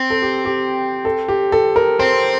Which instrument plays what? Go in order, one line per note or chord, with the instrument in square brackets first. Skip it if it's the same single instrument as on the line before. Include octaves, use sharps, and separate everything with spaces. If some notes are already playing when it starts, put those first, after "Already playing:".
Already playing: [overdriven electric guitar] C4
[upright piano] A4
G4
G4
A4
G4
A4
A#4
[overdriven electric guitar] C4 [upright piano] C5